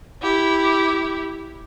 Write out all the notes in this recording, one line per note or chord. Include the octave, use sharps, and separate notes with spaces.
E4 G4